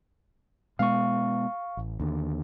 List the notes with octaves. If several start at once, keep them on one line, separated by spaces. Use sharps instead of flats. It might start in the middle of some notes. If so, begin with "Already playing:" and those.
B2 G#3 B3 F5 C#6
A1
D#2 D3